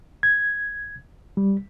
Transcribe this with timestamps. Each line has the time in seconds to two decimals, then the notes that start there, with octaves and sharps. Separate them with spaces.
0.23 G#6
1.37 G3